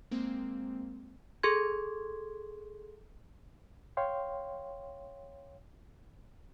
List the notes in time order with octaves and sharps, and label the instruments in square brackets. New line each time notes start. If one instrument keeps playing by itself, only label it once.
[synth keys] G#3 A#3 C4
[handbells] G#4 A4 C6 G#6
[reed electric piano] C#5 F5 G5 C6